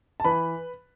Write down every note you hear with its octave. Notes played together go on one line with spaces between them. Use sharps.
A5
E3 B4 B5